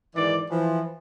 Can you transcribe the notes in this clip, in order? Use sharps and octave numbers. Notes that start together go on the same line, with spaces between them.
G#2 D#3 E3 D5
E3 F3